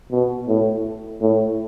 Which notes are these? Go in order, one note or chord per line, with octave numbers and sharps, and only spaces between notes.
B2
A2
A2